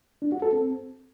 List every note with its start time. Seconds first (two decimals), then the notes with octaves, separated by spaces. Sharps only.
0.22 D4
0.32 F#4
0.42 A4
0.52 C4